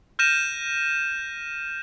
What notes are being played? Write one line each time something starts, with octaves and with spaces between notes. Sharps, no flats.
F6 G6 A#6 D#7 E7